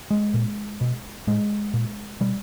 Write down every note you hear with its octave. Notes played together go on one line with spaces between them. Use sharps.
G#3
A#2
B2
A2 G#3
A#2
B2 G3